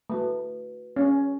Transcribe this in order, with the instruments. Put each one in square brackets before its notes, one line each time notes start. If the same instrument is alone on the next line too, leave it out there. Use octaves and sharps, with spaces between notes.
[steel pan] A3 [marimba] F#4 B4
[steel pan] C#4